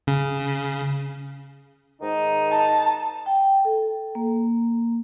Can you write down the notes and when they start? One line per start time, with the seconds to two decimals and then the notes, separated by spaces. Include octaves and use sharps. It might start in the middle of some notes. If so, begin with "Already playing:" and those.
0.07 C#3
2.01 G#2 D#3 D#4
2.52 A5
3.26 G5
3.65 A4
4.15 A#3